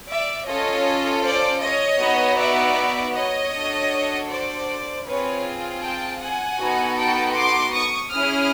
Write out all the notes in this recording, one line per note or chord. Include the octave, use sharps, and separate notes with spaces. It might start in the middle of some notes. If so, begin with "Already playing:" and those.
D5 E5
C#4 F4 A4 C#5 D#5
C5 D5
C#5 D#5
B3 D#4 F#4
D5 E5
C#5 D#5
D4 F#4 A4
C5 D5
C4 F4 G#4 B4 C#5
G5 A5
F#5 G#5
B3 D#4 F#4 A4
G5 A5
C6 D6
C#6 D#6
C#4 E4 G#4 D#6 F6